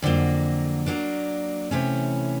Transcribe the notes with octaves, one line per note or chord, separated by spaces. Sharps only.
F2 D3 F#3 A#3
F#3 A#3 D4
C3 E3 A3 C#4